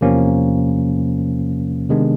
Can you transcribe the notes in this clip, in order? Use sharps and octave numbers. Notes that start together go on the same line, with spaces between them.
E2 C3 F3 A#3 C#4
C3 D#3 G#3 B3 D4